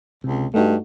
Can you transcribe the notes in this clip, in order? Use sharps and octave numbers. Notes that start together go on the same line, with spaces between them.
C#2 C3
G2 A3 D#4 F#4